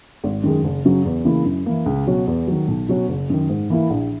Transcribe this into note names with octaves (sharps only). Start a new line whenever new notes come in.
G#1
F#2 D#3 G#3
F#1
F#2 C#3 F#3
E2
C#3 E3 A#3 E4
F#2
E3 A#3
C#2
B2 F#3 C#4 F#4
E2
D#3 F#3
B1
B2 F#3 C#4 F#4
F#1
F#2 D#3
G#2
E3 A#3 E4
A#1